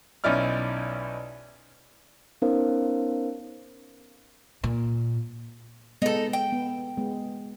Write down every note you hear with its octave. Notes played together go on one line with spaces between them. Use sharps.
B1 C#4 D#4 E4 D5 F6
B3 C#4 D#4 A#4 C5 F5
A#2
G#3 B3 D#4 A4
G5
B3
G#3 B3